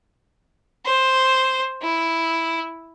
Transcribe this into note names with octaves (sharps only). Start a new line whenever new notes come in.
C5
E4